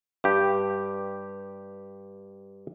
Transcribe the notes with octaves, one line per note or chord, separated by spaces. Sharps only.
G2 G4